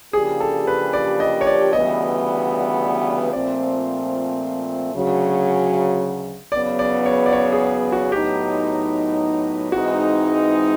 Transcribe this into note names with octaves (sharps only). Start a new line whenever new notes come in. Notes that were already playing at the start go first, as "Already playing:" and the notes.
C#3 F3 A#3 D4 G4 G#4
A4
B4
D5
D#5
C#5
D5
D2 C#3 E3 G3 B3 D#5
A#2 F3 A3 C4 D5
D2 C#3 F#3
E2 C#3 F#3 B3 D5
D5
C#5
D5
C#5
G#4
F#4
A2 F#3 B3 D#4 G4
G#2 E3 G#3 C4 D#4 F#4